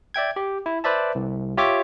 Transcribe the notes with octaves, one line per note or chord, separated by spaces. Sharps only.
D5 E5 G5 G#6
G4
E4
B4 C5 D5 E5 A5
C2
F4 G4 C#5 E5 D6